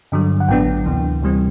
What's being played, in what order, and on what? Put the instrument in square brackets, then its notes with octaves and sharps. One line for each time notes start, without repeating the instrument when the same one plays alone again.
[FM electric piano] G2 D3 F#3
F#5
A1 A2 F#3 B3 D4 G5
D2 C3 E3
D2 C3 E3 G3 C4